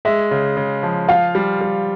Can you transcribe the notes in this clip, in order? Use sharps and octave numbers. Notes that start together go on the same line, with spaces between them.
G#3 E5
C#3
C#3
F3
F4 F5
G3
G3